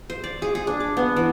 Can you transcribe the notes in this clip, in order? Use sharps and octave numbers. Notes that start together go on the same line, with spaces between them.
C5
D5
G#4
G#4
D4
D6
B3
E3